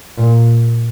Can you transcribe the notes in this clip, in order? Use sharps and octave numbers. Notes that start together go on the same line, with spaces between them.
A#2